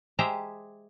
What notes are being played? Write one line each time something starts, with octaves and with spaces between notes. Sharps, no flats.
G#3 G4 G#4 C5 E5 A#5